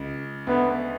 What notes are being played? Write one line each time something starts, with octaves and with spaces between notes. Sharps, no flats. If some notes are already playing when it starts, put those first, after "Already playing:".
Already playing: C#2 C#3
D2 D3 B3